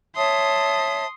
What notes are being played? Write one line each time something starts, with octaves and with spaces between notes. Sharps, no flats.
C#5 E5 A5 C6 D#6